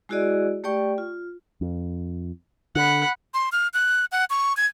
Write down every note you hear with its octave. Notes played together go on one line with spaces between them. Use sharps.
G#3 E4 F#4 G#4 D5 D#5
A3 G4 D5 G5 C#6
F4
F2
D3 F#5 B5
C6
F6
F#6
F#5
C#6
G#6